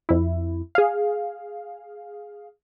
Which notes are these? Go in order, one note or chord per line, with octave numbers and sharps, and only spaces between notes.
F2 E4
G#4 F5